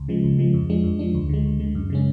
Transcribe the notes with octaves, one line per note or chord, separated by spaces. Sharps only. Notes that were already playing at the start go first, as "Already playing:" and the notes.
Already playing: C#2
C#3 F3 G#3
C#2
C#3 F3 G#3
F2
F3 G#3 D4
F2
F3 G#3 D4
D2
D3 G#3
D2
D3 G#3
F#2
C#3 G#3 C#4